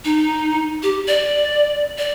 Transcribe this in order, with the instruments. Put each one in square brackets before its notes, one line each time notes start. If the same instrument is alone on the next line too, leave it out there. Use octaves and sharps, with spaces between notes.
[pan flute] D#4
G4
D5
D5